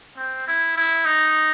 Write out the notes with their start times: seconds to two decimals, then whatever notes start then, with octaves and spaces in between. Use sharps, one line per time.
0.17 C4
0.47 E4
0.77 E4
1.05 D#4